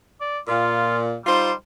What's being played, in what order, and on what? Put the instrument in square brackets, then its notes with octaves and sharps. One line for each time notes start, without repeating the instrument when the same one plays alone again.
[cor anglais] D5
[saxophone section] A#2 [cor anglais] F4
[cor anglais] G3 [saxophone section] D#4 F4 C5